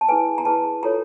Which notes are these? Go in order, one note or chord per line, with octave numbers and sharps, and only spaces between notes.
A5
E4 G#4 B4 G#5
A#5
E4 G#4 B4 A5
F4 A4 C#5 A#5